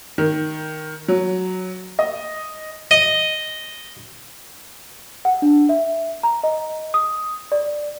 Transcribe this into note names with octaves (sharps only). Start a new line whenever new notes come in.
D#3
F#3
D#5
D#5
F#5
D4
E5
A#5
D#5
D#6
D5